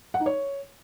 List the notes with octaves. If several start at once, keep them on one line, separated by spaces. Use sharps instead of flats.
F#5
D#4
C#5